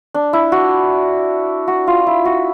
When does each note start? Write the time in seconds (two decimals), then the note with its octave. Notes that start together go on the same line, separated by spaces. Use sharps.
0.14 D4
0.33 E4
0.52 F#4
1.68 F#4
1.87 F4
2.07 E4
2.25 F#4